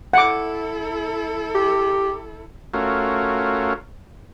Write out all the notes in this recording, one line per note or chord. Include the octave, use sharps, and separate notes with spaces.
E4 A4 F#5 D6
G4
A3 C#4 F4 F#4 A#4